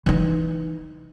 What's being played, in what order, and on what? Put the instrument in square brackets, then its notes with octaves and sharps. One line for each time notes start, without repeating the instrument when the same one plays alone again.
[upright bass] E3 D#4